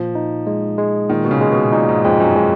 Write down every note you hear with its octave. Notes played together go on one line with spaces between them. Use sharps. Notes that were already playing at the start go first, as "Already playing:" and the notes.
Already playing: A#2 F3
D#4
G#3
G#3
A#2 D#3
B2
C#3
G#3
B2
A#2 D#4
G#2
F2 G#3
F#2
G#3